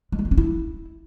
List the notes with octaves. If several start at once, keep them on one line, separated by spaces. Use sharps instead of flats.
G#3
D4
C4
C#4
E4